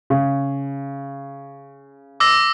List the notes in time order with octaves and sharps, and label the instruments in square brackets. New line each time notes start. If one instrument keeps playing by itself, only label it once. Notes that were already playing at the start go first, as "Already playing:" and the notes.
[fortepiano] C#3
[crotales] D6 E6 A#6